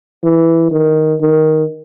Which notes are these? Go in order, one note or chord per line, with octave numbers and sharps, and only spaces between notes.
E3
D#3
D#3